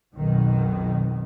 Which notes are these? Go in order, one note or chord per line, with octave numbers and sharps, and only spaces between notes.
B1 F2 B2 D#3